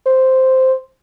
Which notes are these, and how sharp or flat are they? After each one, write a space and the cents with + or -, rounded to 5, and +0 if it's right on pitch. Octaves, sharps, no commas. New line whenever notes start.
C5 -5